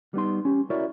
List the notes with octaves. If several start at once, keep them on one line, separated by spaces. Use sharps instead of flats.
G3 B3 D#4 C6
C#4 G4
E4 F#4 A#4 C#5 D5